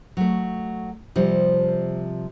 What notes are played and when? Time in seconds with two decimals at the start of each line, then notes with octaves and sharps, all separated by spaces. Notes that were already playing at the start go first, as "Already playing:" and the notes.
0.17 F#3 A3
1.16 C3 F3 G3